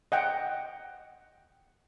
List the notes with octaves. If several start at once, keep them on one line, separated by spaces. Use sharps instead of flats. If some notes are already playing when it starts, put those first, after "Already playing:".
D#5 F#5 G5